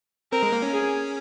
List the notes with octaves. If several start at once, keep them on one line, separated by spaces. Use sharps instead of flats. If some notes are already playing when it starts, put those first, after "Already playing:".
C4 A#4
G#3
A#3
C#4
G#4